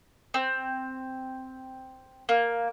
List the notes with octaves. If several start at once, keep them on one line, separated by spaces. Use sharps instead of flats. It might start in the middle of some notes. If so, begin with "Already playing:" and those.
C4
A#3